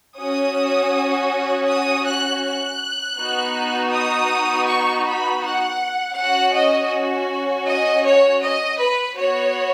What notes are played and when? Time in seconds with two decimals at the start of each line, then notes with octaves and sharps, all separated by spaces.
0.18 C#4 F#4 D#6
1.68 D#6
2.06 F#6
2.43 F#6
3.18 B3 D#4 F#4
3.93 D#6
4.68 C#6
5.05 B5
5.42 F#5
6.17 C#4 F#4 F#5
6.55 D#5
7.66 D#5
8.03 C#5
8.41 D#5
8.79 B4
9.16 B3 F#4 C#5